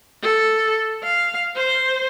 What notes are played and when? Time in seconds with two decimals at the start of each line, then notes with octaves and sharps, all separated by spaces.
0.22 A4
1.04 F5
1.56 C5